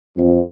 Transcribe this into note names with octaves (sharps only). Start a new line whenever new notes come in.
F2